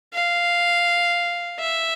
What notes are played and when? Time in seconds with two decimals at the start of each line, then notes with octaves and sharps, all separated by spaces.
0.14 F5
1.60 E5